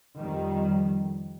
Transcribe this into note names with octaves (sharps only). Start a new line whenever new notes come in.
F2 D#3 G3